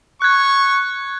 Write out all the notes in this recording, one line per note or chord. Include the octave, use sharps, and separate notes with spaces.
C#6 F#6 G#6